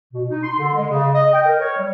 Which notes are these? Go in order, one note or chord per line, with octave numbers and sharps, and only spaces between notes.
B2
D#4
C6
D3
G#3
C#3
D#5
G5
A#4
C#5
G3